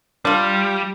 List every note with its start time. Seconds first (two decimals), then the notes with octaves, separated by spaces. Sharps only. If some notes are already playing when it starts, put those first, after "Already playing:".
0.25 G3 D4 F4